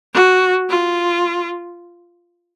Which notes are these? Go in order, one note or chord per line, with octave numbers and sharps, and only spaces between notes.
F#4
F4